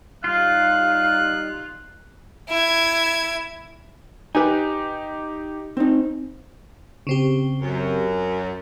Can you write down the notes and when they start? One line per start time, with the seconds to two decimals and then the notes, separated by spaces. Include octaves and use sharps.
0.24 G3 D#4 F4 F5 F#6
2.50 E4 G#6
4.35 D#4 G4 B4 G#5
5.77 C4 D#4
7.07 C#3 C4 G4
7.61 F#2